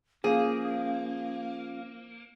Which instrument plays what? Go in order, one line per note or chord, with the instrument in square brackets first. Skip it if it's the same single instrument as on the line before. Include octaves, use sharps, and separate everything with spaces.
[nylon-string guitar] F3 [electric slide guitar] A#3 [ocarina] C#4 [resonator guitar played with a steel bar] G#4